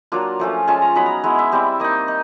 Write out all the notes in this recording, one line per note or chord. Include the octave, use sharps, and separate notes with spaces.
F#3 A#3 D4 F4
F3 A3 C#4 F4
G#3 C#4 F4 A5
A#5
F#3 B3 D#4 B5
A#5
G#3 B3 E4
E5
G3 C4 E4
A#3 D#4 D#5
D#4